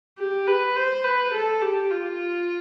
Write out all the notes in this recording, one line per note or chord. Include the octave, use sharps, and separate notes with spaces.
G4
B4
C5
B4
A4
G4
F4